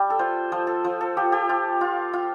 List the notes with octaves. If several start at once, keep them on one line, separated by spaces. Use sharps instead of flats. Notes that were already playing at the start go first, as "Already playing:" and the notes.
Already playing: G3
A4
F4 C5
F3 C5
A4
F3 C5
A4
F3 G4
G4
F4
F4
F4